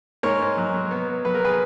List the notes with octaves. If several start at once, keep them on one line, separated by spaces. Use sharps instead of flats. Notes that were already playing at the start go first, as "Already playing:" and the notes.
G#2 A#4 C#5
G#2
F#3
F#3
B3
B3
F#3 B4
A#4
G#4 B4